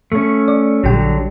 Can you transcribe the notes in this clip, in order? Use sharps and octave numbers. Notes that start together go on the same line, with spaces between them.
A3 C#4
D5
A#1 D3 F#3 G3 G5